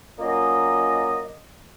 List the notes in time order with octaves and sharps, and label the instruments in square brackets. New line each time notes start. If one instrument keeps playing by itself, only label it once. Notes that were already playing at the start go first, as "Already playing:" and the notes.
[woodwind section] F#3 A#3 C#4 F4 D5 D#5